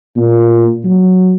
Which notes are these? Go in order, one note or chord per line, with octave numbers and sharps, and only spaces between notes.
A#2
F#3